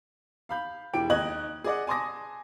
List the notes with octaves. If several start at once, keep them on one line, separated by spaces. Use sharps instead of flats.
F5 B5 G6
E1 E3 G4 G5 D7
D#2 D#4 D#5 F#6 G#6 F#7
G#4 D5 D#5 F#5
G#5 A5 C6 D6 D#6 A#6